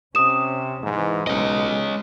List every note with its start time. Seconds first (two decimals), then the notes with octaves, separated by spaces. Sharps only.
0.15 C3 C#4 D#6 E7
0.83 G#2 E3
1.27 B1 G#3 C#4 D#5